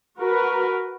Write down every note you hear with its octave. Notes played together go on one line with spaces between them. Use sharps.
F#4 A#4 B4